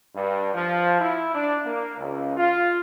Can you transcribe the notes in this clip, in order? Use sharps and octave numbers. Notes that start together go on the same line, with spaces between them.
G2
F3
E4
D4
A#3
C#2
F4